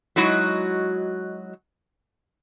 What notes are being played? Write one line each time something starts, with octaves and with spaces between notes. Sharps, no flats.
F#3 G#3 D#4 E4 F#4